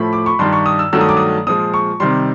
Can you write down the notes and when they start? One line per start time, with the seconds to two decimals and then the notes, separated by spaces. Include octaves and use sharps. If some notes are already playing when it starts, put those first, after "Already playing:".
Already playing: A2 F3 A3 B5
0.13 D6
0.26 C#6
0.39 G2 D#3 G3 C6
0.53 C#6
0.66 D#6
0.79 E6
0.93 G2 D#3 F#3 A3 E6
1.01 D#6
1.09 D6
1.17 D#6
1.47 A#2 F3 G#3 D#6
1.74 C#6
2.00 C3 D#3 G3 C6